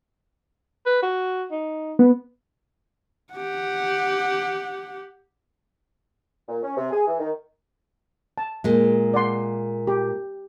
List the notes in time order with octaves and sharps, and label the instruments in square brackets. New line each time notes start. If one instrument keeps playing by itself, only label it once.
[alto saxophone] B4
F#4
D#4
[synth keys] B3
[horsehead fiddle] G4 F#5
[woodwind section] A#2
C#4
C3
G#4
E3
D#3
[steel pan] A5
[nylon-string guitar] A#2 G#3
[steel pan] D5 F#5 C6
G4